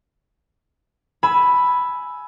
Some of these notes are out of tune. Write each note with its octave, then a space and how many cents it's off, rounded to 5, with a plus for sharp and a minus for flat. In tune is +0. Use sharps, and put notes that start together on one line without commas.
G#5 +20 B5 +0 E6 +0